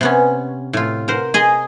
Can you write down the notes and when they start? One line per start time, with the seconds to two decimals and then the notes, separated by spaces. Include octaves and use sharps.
0.01 C3 B3 C#4
0.73 A2 F4
1.08 A#4 C5 F#5
1.34 G#4 D#5 C6